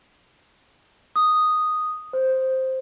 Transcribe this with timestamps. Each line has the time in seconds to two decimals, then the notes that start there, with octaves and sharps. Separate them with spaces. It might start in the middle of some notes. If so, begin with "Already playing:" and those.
1.16 D#6
2.13 C5